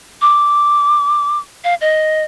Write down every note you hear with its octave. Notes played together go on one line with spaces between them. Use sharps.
D6
F5
D#5